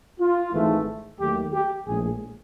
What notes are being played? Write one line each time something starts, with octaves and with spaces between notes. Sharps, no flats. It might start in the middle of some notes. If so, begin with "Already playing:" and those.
F4
G#1 G#2 E3 A3
D#2 D#3 F#3 A3 G4
G4
A#1 A2 F3 G#3 G#4